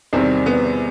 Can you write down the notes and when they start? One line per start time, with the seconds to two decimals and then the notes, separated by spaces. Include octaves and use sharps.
0.13 E2 C3 D#3 G3 C4
0.46 B3